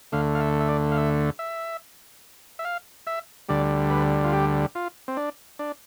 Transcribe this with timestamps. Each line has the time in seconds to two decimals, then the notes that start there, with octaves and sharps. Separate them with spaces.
0.12 D2 D3 A3 F5
0.35 F5
0.41 E5
0.60 E5
0.69 D5
0.92 F5
0.97 E5
1.39 E5
2.59 E5
2.65 F5
3.07 E5
3.49 D2 D3 G3 D5
3.90 B4
4.24 F4
4.33 G4
4.75 F4
5.08 C4
5.17 D4
5.59 D4